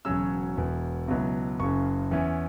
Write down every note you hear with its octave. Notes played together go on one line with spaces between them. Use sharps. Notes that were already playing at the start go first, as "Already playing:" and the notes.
E1 E2 C#3 F#3 C#4 E6
E1 E2 E3
C#2 B2 F#3 B3 E4
F#1 F#2 C#3 C#6
E2 E3 C#4 E4